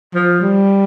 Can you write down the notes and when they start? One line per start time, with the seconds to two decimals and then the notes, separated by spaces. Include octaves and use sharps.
0.14 F3
0.41 G3